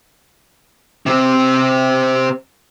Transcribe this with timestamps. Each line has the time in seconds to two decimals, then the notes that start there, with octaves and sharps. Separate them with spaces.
1.06 C3 C4